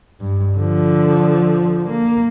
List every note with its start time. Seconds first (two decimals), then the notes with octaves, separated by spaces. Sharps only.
0.20 G2
0.57 D3 F3
1.90 A#3